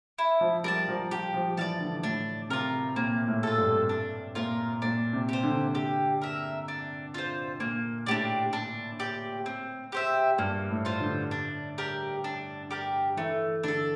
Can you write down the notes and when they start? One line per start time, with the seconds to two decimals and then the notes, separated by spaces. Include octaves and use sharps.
0.19 E4
0.41 F3
0.64 G3 A#4 D5 A5
0.88 F3
1.11 F3 G4
1.34 F3
1.57 E3 D5 F5 A5
1.81 D3
2.03 A2 D4
2.50 C3 F4 A#4
2.96 A#2 A#3
3.27 A2
3.43 F4 A4
3.58 G2
3.89 D4
4.35 A#2 F4 A#4
4.82 A#2 D4
5.13 C3
5.29 G4 C5
5.44 D3
5.75 G4
6.22 A#4 E5
6.68 D4
7.14 F4 C5
7.60 A#2 A#3
8.06 A2 D4 G4 D5
8.53 D4
9.00 G4 D5
9.46 C4
9.92 G4 C5 E5
10.38 G2 A#3
10.70 A2
10.85 F4 C5
11.01 D3
11.31 D4
11.78 G4 A#4 D5
12.24 D4
12.71 G4 A#4 D5
13.17 E3 A3
13.64 D3 D4 A4